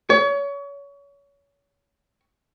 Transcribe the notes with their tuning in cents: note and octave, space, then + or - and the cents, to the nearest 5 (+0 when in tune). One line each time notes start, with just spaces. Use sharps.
C#5 +30